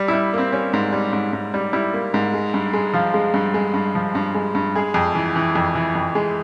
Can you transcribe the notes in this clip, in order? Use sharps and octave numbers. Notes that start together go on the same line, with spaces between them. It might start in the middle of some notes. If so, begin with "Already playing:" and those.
Already playing: G3
E4
G3
A#3 C4
G3 C#4
G#2
G3
G#2
G#2
G3
G3 E4
A#3
G#2
G#3
G2
G#3
F3 F4
G#3
G2
G#3
G2
F3
G2
G#3
G2
G#3 G#4
F2
E3
E3
F2
E3
F2
G#3